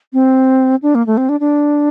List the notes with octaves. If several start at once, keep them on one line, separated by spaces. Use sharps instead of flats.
C4
D4
A#3
A3
C4
D4
D4